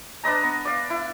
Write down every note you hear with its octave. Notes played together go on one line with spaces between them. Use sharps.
D4 B4 D#5 A#5
B3
D5 F5
E4